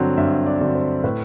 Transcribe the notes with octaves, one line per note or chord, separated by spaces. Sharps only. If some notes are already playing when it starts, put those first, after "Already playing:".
Already playing: G2 D3 F#3 C4 F#5
G2 E5
D5
D3 F#3 C4
C5
A2 B4